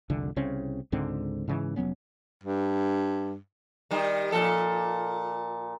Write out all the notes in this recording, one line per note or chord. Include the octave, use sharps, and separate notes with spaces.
F1 C2 D3
C2 C#3 C4 C#4
C#2 G#2 D3 C4
G#2 C#3 E3
F1 F#3 B3 C#4
G2
D#3 G3
A#2 F3 A4